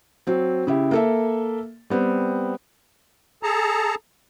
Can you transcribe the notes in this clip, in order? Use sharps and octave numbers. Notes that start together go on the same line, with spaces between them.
F#3 C4
C#3 E4 G4
A#3 A4 E5
G3 B3 C4
G#4 A4 A5 A#5